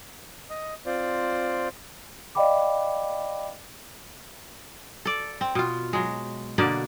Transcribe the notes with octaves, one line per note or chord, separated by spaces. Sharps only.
D#5
C4 F4 C5 D5
D5 D#5 F5 G5 B5 D6
A4 D5
C4
B2 F4
F#3 G#3
B2 D3 A#3 D5